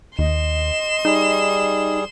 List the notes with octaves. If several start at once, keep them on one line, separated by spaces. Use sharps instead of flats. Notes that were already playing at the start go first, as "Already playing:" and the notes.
D#2 D#5 C6 E7
G3 D#4 G#4